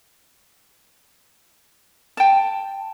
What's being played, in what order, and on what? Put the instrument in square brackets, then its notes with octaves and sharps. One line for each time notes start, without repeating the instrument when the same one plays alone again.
[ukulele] G5 A5